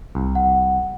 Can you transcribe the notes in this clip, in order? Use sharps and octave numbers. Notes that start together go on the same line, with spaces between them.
C2
F#5